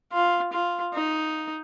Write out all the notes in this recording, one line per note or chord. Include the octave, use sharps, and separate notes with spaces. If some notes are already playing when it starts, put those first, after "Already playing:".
F4
F4
D#4